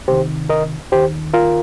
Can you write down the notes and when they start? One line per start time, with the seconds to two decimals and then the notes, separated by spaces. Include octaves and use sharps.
0.08 C2 C3 D#3 G4 C5
0.49 A#4 D#5
0.92 D#2 D#3 G4 C5
1.34 F4 A#4